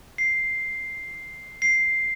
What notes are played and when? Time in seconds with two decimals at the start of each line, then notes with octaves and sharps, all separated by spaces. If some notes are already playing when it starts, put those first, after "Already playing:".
0.18 C7
1.62 C7